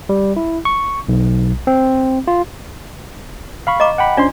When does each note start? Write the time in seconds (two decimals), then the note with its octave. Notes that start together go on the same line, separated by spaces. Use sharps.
0.09 G3
0.36 E4
0.65 C#6
1.09 B1
1.67 C4
2.28 F4
3.67 F5 B5 C#6
3.80 D#5 A#5 D6
3.98 F#5 G5 B5
4.17 C#4 D4 F4 C5 D5 C6